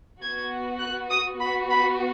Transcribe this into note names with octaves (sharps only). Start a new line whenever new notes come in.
B3 F#4 G#6
F#6
D#6
B3 F#4 B5
B5